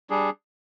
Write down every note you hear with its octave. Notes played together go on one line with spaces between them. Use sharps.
G3 D4 G#4